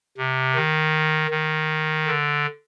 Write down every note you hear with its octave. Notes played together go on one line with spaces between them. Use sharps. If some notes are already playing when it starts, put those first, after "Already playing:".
C3
D#3
D#3
D3